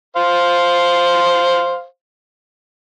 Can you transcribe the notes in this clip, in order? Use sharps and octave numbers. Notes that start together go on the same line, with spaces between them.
C5 F5